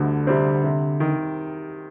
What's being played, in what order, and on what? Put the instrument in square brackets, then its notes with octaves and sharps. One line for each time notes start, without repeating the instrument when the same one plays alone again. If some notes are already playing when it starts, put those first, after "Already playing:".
Already playing: [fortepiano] D2 G3 [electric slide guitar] D3
[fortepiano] C3 G3 C4
C3
D#3